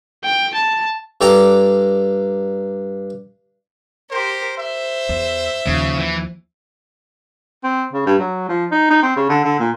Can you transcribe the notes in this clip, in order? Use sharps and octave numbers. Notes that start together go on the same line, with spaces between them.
G5
A5
G2 A4 D5 G5 A#5 D6
G4 A#4 C5
C5 E5
E2
D#2 C#3 F3
E3
C4
C#3
G2
F#3
F3
D#4
D#4
C4
C#3
D3
D3
A#2